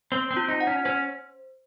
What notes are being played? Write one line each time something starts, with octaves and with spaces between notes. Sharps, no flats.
C4 C5
C4
F4
D#4
F#5
C#4
C#4 C5